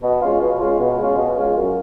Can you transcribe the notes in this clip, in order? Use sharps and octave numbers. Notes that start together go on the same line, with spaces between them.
B2
G#3 C#4 F4
B2
G#3 C#4 F4
B2
G#3 C#4 F4
B2
G#3 C#4 F4
F#2